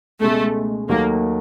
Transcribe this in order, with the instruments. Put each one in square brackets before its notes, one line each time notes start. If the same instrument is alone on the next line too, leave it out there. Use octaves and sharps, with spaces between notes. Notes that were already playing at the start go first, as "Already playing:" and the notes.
[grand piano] C#2 B2 G#3 [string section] A3
[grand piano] D#2 D#3 F#3 A3 [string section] A#3